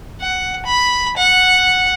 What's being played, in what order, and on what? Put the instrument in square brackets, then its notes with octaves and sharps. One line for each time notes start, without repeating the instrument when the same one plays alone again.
[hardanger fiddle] F#5
B5
F#5